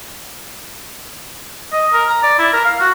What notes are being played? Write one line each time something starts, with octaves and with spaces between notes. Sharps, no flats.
D#5
A#4
A#5
D5
E4
A#4
F5
F#4